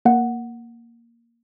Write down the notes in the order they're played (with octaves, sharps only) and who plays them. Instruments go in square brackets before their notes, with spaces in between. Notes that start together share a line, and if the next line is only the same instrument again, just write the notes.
[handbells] A#3 F#5